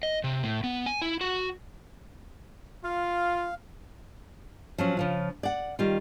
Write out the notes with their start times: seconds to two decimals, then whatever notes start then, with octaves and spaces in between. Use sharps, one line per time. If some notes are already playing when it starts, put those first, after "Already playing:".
0.03 D#5
0.24 C3
0.43 A2
0.64 B3
0.86 G#5
1.02 E4
1.21 F#4
2.84 F4 F5
4.78 F3 F#3 C#4
4.97 C#3 F3 F4
5.43 D5 F#5
5.79 D#3 G3 F4